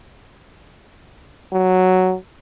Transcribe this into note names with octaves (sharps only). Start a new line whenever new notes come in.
F#3